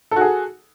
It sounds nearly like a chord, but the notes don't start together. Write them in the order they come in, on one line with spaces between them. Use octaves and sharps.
A4 F#4 G#4